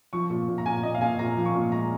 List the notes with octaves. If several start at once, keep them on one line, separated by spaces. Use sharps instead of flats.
F3 C#6
A#2
A#2
A#5
A#2 G#5
A#2 D#5
F5
A#2 G#5
A#2 A#5
F3
C#6
A#2
G#3 A#5